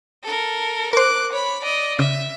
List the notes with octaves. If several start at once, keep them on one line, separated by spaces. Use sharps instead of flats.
A4 A#4
A#4 C5 D6 F#6
C#5 B5
D5 D#5
C#3 E5